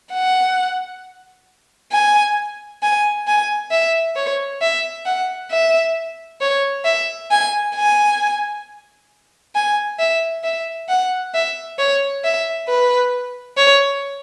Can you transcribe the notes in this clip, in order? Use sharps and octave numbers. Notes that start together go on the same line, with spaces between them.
F#5
G#5
G#5
G#5
E5
C#5
E5
F#5
E5
C#5
E5
G#5
G#5
G#5
E5
E5
F#5
E5
C#5
E5
B4
C#5